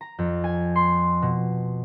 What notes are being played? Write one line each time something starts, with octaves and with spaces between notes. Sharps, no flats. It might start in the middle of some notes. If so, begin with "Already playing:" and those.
A#5
F2
G#5
C6
B2